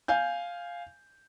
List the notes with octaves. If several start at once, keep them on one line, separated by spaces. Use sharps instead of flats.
F5 G#5 G6